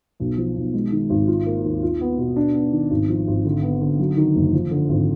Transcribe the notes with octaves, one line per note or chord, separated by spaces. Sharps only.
B1
F3
B1
G#3
D#3
G#1
F4
A#3
D#2
F4
B3
B2
D4
B3
D#3
G#1
F3
G#1
D3
B3
D3
F#3
D#3
F#1
F3
D3
G#1